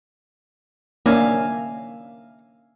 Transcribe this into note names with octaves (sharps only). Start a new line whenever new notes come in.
A#3 C#4 D4 E5 F5 G#5